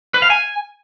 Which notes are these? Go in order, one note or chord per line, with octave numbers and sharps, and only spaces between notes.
B4
F5
G#5